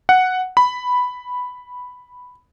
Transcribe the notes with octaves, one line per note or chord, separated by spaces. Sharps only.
F#5
B5